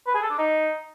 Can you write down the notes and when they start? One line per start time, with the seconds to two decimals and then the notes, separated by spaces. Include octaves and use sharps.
0.07 B4
0.15 G#4
0.23 A4
0.30 D4
0.38 D#4